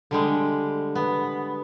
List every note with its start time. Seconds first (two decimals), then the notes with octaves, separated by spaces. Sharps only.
0.11 D3 G3 G#3
0.95 B3